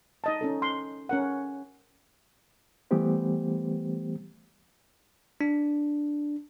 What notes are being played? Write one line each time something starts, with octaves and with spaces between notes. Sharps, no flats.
D#4 D#5 A5
C#4 D#4 A4
C6
C#4 A#4 F#5
E3 G3 A3 B3 G4 C5
D4